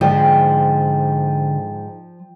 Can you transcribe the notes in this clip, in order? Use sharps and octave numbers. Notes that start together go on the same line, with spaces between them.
G#2 D3 F3 G5